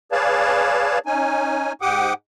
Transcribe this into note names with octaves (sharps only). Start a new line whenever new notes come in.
G#4 B4 C#5 D5 F5 A5
C#4 D#4 G#5
G#2 G4 F#5 G5 D6 D#6